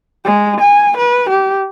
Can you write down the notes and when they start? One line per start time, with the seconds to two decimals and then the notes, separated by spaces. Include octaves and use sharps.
0.24 G#3
0.60 G#5
0.97 B4
1.30 G4